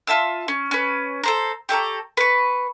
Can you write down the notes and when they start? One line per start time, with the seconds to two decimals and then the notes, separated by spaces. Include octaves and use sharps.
0.07 F4 E5 A5 E6
0.48 C#4
0.71 C#4 B4
1.23 A4 C5 A#5
1.69 G4 A4 C#5 A#5
2.17 B4 C#6